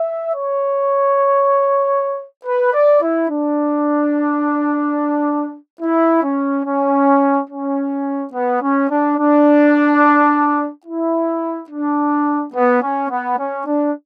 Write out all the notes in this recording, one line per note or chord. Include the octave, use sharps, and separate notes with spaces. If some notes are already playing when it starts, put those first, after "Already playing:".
Already playing: E5
C#5
B4
D5
E4
D4
E4
C#4
C#4
C#4
B3
C#4
D4
D4
E4
D4
B3
C#4
B3
C#4
D4